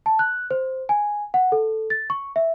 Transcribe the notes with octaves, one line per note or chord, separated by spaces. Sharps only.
A5
F#6
C5
G#5
F#5
A4
A6
C#6
E5